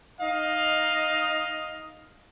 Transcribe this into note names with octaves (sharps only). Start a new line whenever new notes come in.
D#4 D#5 F5